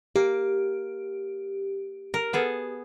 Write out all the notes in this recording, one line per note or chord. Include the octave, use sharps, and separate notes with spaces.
A#3 G4
A#4
B3 G#4 A4